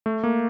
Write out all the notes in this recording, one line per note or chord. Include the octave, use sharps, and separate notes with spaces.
A3
A#3